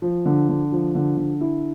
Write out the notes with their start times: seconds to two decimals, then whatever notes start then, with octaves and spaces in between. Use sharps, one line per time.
0.02 F3
0.26 D3
0.49 D3
0.72 F3
0.95 D3
1.17 D3
1.41 E4